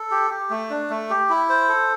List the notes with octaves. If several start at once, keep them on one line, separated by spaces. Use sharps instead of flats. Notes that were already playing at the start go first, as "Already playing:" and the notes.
Already playing: A4
G4
G4
A3
D4
A3
G4
E4
C5
A4